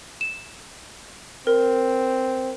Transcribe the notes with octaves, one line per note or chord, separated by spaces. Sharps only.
E7
C4 A#4